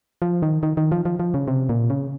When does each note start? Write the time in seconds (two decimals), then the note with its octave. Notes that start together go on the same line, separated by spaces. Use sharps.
0.22 F3
0.42 D#3
0.63 D#3
0.77 D#3
0.92 F3
1.05 F3
1.20 F3
1.34 C#3
1.48 C3
1.69 A#2
1.90 C#3